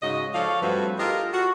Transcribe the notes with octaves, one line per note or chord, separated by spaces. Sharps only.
G#2 C#3 F#4 D#5
F3 A4 C#5 D5 F5
G2 F3 A3 C4 F#4 B4
F4 G4 A4 A#4 D#5
F#4